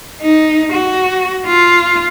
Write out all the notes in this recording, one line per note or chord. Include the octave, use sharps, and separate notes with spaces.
D#4
F#4
F4